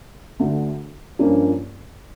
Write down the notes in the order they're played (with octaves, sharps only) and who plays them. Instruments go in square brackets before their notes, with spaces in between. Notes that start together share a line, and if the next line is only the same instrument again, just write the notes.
[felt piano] D2 D3 A3
G2 F3 A#3 C#4